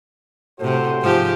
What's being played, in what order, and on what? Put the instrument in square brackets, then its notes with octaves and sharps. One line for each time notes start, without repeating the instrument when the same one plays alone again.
[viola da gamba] A2 C3 [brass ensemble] F#4 A4 C5
[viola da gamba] G#2 F3 G4